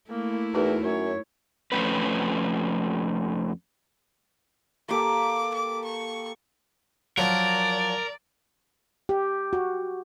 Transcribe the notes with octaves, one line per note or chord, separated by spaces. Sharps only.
A3 A#3 E4
E2 D#4 F#4 A#4 B4
F#2 C#5
F2 B2 F3 A3 C#4 B4
A#3 G4 A4 D6
D6
C#6
F3 F#3 A#4 D5
G4
F#4